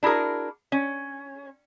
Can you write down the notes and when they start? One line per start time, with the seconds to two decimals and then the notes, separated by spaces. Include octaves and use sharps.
0.03 D4 E4 F#4 G#4 A#4
0.72 C#4